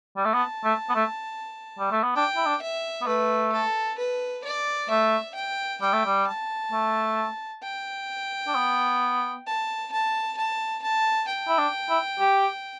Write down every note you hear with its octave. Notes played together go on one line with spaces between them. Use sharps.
G3
A3
B3 A5
A3
B3
A3
G3
A3
B3
D4 G5
E4
D4
E5
B3
A3 B4
A4
B4
D5
A3 E5
G5
G3 G5
A3
G3
A5
A3
G5
D4
B3
A5
A5
A5
A5
G5
E4
D4
E4
G4